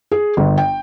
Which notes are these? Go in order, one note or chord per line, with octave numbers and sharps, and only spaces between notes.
G#4
G1
G5